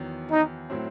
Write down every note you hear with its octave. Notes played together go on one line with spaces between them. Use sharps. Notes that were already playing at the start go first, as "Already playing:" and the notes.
Already playing: E2 D#3 F#3
D#4
A2 F#3 C4